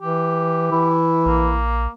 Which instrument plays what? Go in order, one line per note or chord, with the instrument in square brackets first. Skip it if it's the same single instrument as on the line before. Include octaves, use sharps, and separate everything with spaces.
[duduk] E3 [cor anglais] G4
[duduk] E3 [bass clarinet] E4
[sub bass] A#1 [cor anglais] A#3